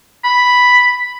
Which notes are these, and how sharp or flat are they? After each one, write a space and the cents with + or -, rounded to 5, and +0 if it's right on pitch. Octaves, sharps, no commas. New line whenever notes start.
B5 +0